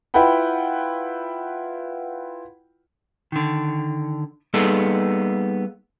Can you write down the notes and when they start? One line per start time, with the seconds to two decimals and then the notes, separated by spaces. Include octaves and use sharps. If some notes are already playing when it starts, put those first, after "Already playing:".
0.14 E4 F4 B4 F#5 G5 B5
3.32 D3 D#3
4.54 G3 A#3 B3 D#4 G#4 A4